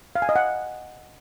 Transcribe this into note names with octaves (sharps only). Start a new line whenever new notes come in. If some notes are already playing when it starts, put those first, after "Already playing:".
F5
G#5
D#5
F#5